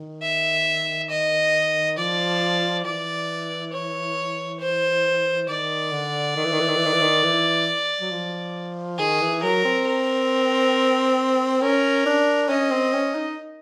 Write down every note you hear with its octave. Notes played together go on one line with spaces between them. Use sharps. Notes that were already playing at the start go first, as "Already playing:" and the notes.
Already playing: D#3
E5
D#5
F3 D5
E3 D5
C#5
C5
D#3 D5
D3
D#3
E3
D#3
E3
D#3
E3
D#3
E3
D#3
E3
F#3
F3
D#3 G#4
E3
F#3 A#4
C4
A#4
C#4 A#4
D4
C#4 D#5
C4
C#4
D#4